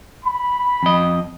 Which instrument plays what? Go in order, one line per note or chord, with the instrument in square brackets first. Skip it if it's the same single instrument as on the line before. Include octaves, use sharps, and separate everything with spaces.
[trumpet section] B5
[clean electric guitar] F2 D#5